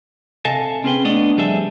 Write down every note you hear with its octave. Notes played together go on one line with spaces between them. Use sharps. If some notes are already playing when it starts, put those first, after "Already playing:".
C3 A4 D#5 F5 G#5 A5
C4 C#4 G#4 B4 G5
A3 B3 D4 D5 D#5
C2 F2 G3 G#4 A4 E5